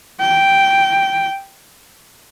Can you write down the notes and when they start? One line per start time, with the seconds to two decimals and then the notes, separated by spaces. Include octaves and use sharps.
0.21 G5